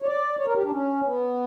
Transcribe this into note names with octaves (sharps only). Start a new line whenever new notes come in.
C#5
D5
C#5
A#4
G4
D4
C#4
B3